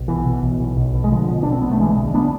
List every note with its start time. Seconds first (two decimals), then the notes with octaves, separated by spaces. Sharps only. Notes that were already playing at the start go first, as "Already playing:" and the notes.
Already playing: B1
0.08 B2 E3
0.26 B2
0.43 B1
0.60 B1
0.77 B1
0.94 B2
1.04 G#3
1.11 B1 D3 F3
1.29 B2
1.43 B2 D4
1.52 C4
1.62 B1 B3
1.71 A3
1.80 D2 E3 G#3
1.97 D2
2.14 B3 D4